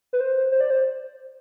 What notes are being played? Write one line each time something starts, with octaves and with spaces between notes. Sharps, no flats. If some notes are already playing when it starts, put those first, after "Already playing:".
B4
C5
C5
D5
C5